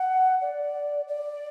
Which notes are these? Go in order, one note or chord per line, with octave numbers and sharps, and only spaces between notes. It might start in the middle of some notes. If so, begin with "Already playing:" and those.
Already playing: F#5
D5
D5